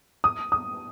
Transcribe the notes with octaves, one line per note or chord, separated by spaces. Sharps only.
D#6
D#6